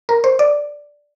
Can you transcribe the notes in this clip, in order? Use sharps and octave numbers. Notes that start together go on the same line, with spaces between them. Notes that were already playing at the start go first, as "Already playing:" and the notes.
A#4
C5
D5